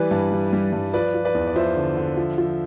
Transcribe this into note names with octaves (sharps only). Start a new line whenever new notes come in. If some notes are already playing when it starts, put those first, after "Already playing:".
Already playing: E3 G3 B4 D5
G2
G3
G3
G2
F3 B4 D5
F3
B4 D5
E2
D5
F3 C5 E5
D3
D3
F3
F3